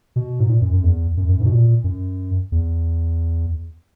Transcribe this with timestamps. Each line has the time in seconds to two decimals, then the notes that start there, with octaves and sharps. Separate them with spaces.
0.16 B2
0.40 G#2
0.49 A#2
0.61 F#2
0.73 F#2
0.84 E2
1.17 F#2
1.29 F#2
1.40 G#2
1.45 B2
1.51 A#2
1.84 F#2
2.52 E2